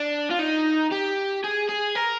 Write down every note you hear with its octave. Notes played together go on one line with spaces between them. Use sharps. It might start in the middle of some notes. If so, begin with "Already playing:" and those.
Already playing: D4
F4
D#4
G4
G#4
G#4
A#4